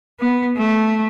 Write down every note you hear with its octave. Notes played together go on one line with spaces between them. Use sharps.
B3
A3